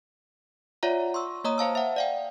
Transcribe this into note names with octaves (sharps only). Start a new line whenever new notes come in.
F4 C#5 D5 E5 F#5 A#5
C6 C#6 E6
A#3 C#5 D#5 A#5 D#6
C5 F5 A5 E6
E5 F#5
D5 F5 G5